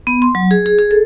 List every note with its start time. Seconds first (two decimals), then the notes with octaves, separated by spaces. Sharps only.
0.07 B3
0.22 C6
0.35 F#3
0.51 G#4
0.66 G#4
0.79 G#4
0.91 A4